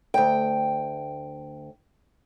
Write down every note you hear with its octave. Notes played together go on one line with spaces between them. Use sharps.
D2 G5